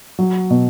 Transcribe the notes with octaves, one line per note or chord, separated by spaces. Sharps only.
F#3
B2